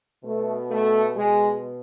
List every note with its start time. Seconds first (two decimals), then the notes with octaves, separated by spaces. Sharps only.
0.25 B2 A3
0.71 A3
1.16 B2 G#3